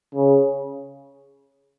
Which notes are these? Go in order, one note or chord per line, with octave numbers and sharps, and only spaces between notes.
C#3